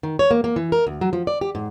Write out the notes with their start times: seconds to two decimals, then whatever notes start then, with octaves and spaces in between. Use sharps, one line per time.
0.03 D#3
0.19 C#5
0.31 A#3
0.44 A#3
0.56 E3
0.72 A#4
0.87 D2
1.01 F#3
1.13 F3
1.27 D5
1.41 G4
1.55 G#2